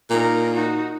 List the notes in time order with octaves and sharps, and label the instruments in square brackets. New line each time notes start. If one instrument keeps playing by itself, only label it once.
[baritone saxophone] A#2 [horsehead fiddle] D#4 A#4
[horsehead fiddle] D#4 F#4